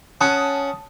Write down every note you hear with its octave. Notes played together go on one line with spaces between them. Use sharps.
C#4 F#5 A5 D#6